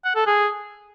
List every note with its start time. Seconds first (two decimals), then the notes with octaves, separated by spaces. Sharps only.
0.04 F#5
0.15 A4
0.26 G#4